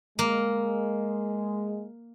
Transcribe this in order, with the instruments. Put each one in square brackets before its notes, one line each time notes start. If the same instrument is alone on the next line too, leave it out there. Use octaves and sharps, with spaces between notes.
[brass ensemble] G#3 [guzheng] A#3